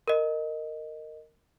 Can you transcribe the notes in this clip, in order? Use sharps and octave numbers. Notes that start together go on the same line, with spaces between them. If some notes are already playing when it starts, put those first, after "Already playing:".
A#4 D#5